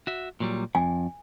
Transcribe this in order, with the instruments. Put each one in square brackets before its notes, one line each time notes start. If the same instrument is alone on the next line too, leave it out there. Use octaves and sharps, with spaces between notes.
[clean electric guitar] F#4 E5
A#2 F#3 G3
[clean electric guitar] F2 [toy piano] G#5